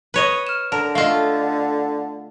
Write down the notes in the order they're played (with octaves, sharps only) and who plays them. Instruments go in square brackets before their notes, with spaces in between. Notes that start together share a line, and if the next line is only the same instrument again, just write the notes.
[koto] B4 C#5 D#5
[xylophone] F6 E7
[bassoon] D3 [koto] A#4 [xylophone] A5
[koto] A3 F4 [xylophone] D#5 F5